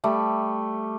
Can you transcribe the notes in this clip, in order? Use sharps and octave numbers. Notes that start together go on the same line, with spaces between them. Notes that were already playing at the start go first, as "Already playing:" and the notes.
G3 A3